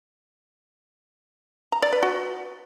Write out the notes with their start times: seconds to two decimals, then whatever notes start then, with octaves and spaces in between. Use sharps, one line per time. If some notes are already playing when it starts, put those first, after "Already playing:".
1.72 A#5
1.82 D5
1.93 B4
2.03 F#4